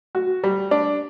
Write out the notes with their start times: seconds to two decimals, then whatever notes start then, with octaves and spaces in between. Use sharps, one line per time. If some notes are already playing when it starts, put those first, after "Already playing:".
0.15 F#4
0.44 G3
0.71 D4